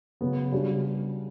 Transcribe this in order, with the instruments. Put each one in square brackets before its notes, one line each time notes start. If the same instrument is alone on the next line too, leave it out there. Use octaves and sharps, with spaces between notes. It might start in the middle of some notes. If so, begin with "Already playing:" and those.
[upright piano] C#3 F#3 B3 F#4
C#3 G3 D4 F#4